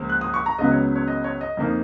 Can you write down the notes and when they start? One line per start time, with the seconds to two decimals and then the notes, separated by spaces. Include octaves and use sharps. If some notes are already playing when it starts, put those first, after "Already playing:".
Already playing: C#2 C#3 F3 A#3
0.10 F#6
0.21 D#6
0.34 C#6
0.46 A#5
0.58 C#2 C#3 F#3 B3 D#5
0.71 C#5
0.96 C#5
1.08 D#5
1.24 C#5
1.41 D#5
1.57 F2 F3 A#3 D#4